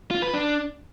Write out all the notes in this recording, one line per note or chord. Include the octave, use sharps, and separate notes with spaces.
F4
B4
D4